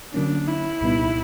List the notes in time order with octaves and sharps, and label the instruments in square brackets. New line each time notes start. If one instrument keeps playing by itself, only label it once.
[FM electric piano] D3 F#3 A#3 C#4 [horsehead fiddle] D4
[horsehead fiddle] E4
[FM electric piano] C2 A#2 G3 B3 D#4